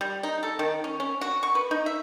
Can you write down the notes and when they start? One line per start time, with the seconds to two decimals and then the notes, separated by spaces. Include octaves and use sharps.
0.01 G3
0.23 D#4
0.43 A4
0.59 D#3
0.84 C#4
1.00 C#4
1.21 F#4
1.43 C#6
1.55 B4
1.71 D#4
1.86 E5